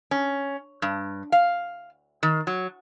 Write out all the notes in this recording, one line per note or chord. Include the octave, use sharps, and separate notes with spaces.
C#4
G2
F5
D#3
F#3